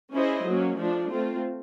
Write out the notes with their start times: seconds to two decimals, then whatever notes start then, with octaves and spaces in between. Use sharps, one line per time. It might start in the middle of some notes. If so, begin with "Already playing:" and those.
0.14 C#4 E4 G#4 C5 D#5
0.47 F#3 A#3 C#4
0.79 F3 A3 D4
1.12 A3 C4 F4